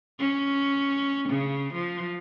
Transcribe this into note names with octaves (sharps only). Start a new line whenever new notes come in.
C#4
C#3
F3